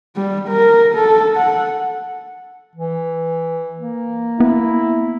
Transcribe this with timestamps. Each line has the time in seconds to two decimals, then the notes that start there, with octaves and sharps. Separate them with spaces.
0.16 G3
0.49 A#4
0.95 A4
1.36 F#5
2.75 E3
3.78 A#3
4.40 B3 E4